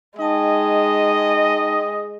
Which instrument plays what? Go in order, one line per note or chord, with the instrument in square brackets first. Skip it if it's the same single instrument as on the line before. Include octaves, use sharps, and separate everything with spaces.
[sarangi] G#3 [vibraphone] D#4 G5 A5 [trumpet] D#5